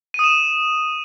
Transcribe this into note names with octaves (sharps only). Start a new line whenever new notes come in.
D#6 D#7 E7